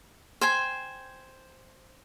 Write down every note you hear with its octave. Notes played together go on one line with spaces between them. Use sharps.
C5 G5 G#5